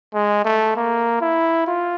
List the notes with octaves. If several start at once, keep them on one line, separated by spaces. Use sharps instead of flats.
G#3
A3
A#3
E4
F4